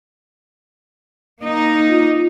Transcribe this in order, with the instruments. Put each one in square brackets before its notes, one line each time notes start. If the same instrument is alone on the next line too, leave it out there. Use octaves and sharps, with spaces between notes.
[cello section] A#3 D#4
[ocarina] F4